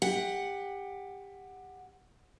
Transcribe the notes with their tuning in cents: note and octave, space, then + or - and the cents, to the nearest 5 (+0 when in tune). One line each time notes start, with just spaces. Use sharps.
G4 +20 F#5 +0